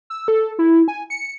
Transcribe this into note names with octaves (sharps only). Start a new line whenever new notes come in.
E6
A4
E4
G#5
C#7